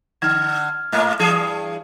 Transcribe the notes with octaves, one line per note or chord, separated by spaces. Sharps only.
D3 F6 G#6
G#2 A#3
G2 E3 G#4